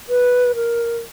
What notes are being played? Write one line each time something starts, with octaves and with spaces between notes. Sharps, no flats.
B4
A#4